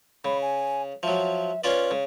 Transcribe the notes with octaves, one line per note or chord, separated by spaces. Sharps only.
C#3 B5
G#5
F3 F#3 E5
C#4 F4 B4 D5
C#3